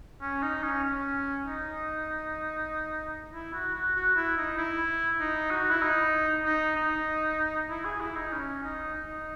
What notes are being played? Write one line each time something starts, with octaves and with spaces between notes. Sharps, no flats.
C#4
D#4
C#4
C#4
D#4
E4
F#4
F#4
F#4
E4
D#4
E4
D#4
F#4
E4
D#4
D#4
D#4
E4
G#4
E4
D#4
C#4
D#4
D#4